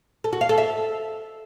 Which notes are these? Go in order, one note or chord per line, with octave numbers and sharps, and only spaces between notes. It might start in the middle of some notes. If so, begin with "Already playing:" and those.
A4
F#4
F5
A4
E5